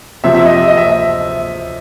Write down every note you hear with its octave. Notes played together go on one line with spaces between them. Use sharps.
C3 F3 E5
E5
D#5
E5
D#5
E5